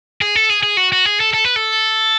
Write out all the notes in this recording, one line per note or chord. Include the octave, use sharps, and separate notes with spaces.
G#4
A4
G#4
G#4
F#4
F#4
G#4
A4
A4
B4
A4